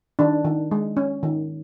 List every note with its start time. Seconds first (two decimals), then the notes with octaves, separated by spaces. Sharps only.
0.19 D#3 D4
0.45 D#3
0.71 G#3
0.97 C#4
1.23 D#3